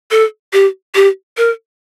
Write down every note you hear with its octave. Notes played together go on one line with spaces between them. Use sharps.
A4
G4
G4
A#4